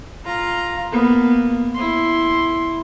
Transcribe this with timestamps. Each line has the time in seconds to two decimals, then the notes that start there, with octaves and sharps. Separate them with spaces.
0.25 F4 A#5
0.92 A#3 B3
1.75 E4 C6